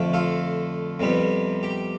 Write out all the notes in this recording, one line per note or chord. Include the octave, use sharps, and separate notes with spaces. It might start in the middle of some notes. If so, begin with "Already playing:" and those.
Already playing: F2 D3 F3 A3
F4 A4
F2 C3 G3 B3
G4